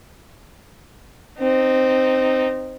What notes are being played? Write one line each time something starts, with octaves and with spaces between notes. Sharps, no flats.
C4 D#4